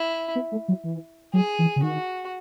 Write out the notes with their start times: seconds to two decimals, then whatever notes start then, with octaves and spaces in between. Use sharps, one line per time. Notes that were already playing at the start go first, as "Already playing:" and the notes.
Already playing: E4
0.35 B3
0.52 A3
0.68 F#3
0.84 E3
1.34 F#3 G#4
1.59 E3
1.76 C#3
1.83 D#3 F#4